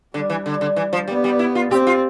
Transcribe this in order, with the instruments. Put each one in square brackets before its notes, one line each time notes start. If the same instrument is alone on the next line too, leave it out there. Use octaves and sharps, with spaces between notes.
[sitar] D3 [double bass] G3
[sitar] E3
D3
D3
E3
F3
[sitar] G3 [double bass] B3
[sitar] G3
E4
F4
[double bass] C4 [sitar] G4
[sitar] F4